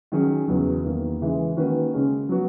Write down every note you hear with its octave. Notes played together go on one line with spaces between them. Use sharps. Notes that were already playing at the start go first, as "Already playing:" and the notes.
D#3 F#3 C#4 G#4
E2 C#3 F#3
E2 D#3 A#3
C#3 E3 G#3
D#3 A#3 C#4 F#4 B4
C#3 G#3 C#4
F#3 B3 F#4